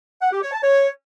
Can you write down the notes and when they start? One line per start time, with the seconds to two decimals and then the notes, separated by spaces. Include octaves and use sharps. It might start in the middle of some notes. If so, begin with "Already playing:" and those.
0.22 F#5
0.32 G4
0.42 C#5
0.52 A5
0.63 C#5